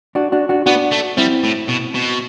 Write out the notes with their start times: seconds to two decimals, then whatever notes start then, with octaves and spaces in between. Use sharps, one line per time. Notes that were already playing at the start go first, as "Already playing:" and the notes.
0.15 D4 F#4
0.32 D4 F#4
0.49 D4 F#4
0.66 B3 D4 F#4
0.92 A3
1.17 G3 C4 E4
1.43 A2
1.68 B2
1.94 B2